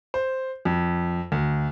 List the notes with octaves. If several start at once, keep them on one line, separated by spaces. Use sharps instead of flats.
C5
F2
D2